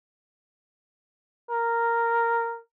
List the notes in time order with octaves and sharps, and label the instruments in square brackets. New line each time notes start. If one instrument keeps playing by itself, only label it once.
[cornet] A#4